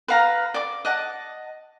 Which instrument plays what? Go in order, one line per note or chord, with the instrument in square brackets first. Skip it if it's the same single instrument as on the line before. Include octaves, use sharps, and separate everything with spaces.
[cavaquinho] B4 F5 A#5
D5 D6
D#5 F#5 A5